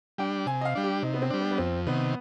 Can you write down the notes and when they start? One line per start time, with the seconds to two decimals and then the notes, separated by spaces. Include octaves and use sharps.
0.18 G3 D4 G5
0.46 C3 G#5
0.61 D#5
0.65 F5
0.75 G3 D4
0.84 G4
1.03 C3 D#4
1.14 B3
1.22 C4
1.30 G3 D4
1.41 B3
1.51 B3
1.58 F2 C4
1.87 C3 D#3 B3